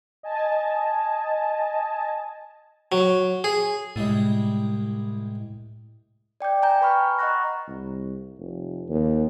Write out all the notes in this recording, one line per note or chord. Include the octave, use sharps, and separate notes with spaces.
D#5 G#5 A5
F#3
G#4
C2 A2 G3 G#3
D5 G5 D6 G6
G5 G#5 A#5 G6
B4 B5 C#6 F6
D#5 F#5 A#5 C#6 F#6 A#6
C2
F1
D#2